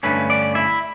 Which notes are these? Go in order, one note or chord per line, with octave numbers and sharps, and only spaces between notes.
G2 D3 A3 C#4 B4
D5
E4